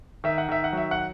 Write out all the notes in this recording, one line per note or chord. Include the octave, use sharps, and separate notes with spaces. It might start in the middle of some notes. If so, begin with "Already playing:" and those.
D#3 E5
F#5
D#3 E5
F#5
F#3 E5
F#5